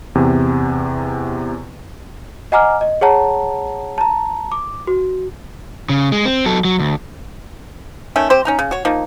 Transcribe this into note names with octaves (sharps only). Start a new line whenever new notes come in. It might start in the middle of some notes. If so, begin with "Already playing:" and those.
E2 C3
D#5 F#5 G#5 A#5 D6 F6
D#5
G#4 C#5 F#5 A5 A#5
A5 A#5
D6
F#4
C#3
G#3
C4
F#3 A4
F#3
D2
D#3 A3 C#4
C4 G4 C5
C#4 D#4 A#5
C#3
F#4 C#5
F3 A#3 D#4